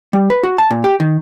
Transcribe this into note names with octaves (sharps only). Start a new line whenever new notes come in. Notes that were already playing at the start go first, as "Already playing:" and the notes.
G3
B4
F#4
A5
A#2
G4
D#3